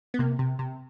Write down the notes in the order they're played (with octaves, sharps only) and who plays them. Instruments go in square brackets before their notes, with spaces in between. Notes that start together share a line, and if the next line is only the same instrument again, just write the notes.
[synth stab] B3
C3 A#3
C3
C3